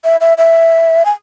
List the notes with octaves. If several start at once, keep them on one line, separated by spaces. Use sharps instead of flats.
E5
E5
E5
G#5